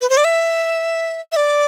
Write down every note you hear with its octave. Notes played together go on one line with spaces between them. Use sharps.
B4
C5
D5
E5
E5
D5